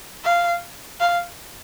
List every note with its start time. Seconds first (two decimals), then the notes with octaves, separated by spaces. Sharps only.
0.24 F5
1.00 F5